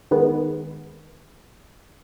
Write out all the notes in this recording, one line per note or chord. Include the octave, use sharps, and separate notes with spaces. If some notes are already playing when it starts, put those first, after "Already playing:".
D#3 G#3 B3